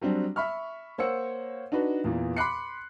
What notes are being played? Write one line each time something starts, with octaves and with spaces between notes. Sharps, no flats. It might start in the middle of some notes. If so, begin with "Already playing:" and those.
F#3 G3 C4 D4
E5 B5 C#6 F6
A#3 C5 C#5 F#5 E6 C#7
D4 D#4 F#4 B4
E2 A#2 E3
B5 C6 D6 F#6 C7 C#7